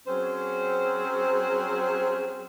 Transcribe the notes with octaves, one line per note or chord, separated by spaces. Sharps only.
F#3 C4 C#4 G#4 C5